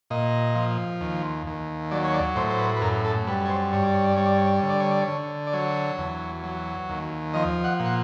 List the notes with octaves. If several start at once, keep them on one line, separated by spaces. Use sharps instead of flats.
A#2 D#5
F3
D#2
D#2
F#3 D5
C#5
D5
A2 C5
C5
B4
B4
F#2 A#4
A4
G3 B4
C#5
C5
G2 C#5
D5
C#5
D5
G3 C#5
D5
C#5
D5
D3 C#5
D5
C#5
D5
C#5
D3
D5
F#3 C#5
E2
F#3
D#2
F3 D#5
F#5
A#2
F#5